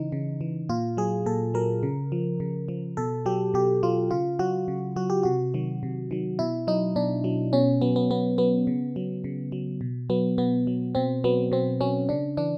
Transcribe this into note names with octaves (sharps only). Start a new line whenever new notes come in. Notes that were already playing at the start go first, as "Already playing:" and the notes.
Already playing: C#3 E3 D#4
C#3
E3
A#2 F4
F#3 G#4
A#2 A4
F#3 A#4
C#3
F3
C#3
F3
B2 A4
F#3 G4
B2 G4
F#3 F4
C#3 F4
F#3 F#4
C#3
F#3 F#4
G4
C3 F#4
D#3 F#3
C3
D#3 F#3
B2 E4
F#3 D#4
B2 D4
F#3
B2 C#4
F#3 B3
B3
B2 B3
F#3 B3
C#3
F#3
C#3
F#3
B2
F#3 B3
B2 B3
F#3
B2 C4
F#3 B3
B2 C4
F#3 C#4
C#3 D4
E3 D4